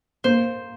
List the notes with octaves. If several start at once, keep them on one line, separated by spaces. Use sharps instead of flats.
A#3 C5